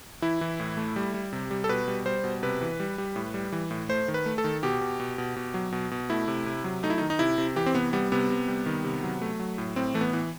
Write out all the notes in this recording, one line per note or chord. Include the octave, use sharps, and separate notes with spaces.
E3 E4
E3
A2
A3
G3
G3
C3
G3
A4
B2 B4
G3
G3 C5
B2
C3 B4
E3
G3
G3
A2
G3
E3
A2
A3 C5
D#3
B4
A3
A4
D#3
B2 G4
B2
B2
B2
B2
F#3
B2
B2
A3 E4
C3
C3
F#3
A3 D#4
E4
D#4
D#3
D#4
C3 E4
C3
E3 G4
C4
C3 B3
G3 B3
C3 B3
C3
G3
D#3
C3
F#3
A3
F#3
A2
A2 C4
E3 A3
B3
E3